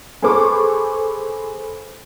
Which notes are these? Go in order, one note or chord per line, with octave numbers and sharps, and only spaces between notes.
G#4 A4 B4 C5 C#6 D6